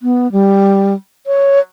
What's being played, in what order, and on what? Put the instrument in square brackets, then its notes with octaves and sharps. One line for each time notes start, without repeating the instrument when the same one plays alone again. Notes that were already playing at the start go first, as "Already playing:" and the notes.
[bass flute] B3
G3
C#5